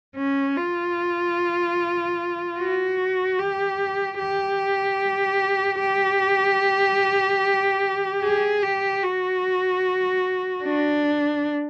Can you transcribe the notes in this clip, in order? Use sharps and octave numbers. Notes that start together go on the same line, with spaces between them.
C#4
F4
F#4
G4
G4
G4
G#4
G4
F#4
D4